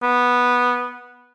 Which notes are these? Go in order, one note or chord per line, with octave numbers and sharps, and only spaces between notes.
B3